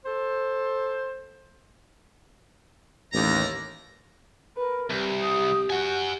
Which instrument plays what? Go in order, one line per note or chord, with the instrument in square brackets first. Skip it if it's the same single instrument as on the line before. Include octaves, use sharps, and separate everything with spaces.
[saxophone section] A4 C5
[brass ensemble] A1 D#2 [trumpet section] E4 D5 A#5
[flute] A#4 [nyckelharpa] B4
[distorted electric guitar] C2 [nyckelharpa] G4
[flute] D#6
[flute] F#4 [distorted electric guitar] F#5 G#5